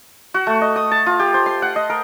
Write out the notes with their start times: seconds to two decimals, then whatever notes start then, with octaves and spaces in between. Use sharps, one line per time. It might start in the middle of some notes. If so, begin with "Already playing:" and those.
0.34 F#4
0.47 A3
0.62 D#5
0.76 D#6
0.91 A5
1.06 F4
1.20 G4
1.34 C5
1.46 C6
1.62 F#5
1.76 D#5
1.90 A#4